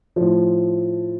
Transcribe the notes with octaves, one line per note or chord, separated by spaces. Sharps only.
A2 F3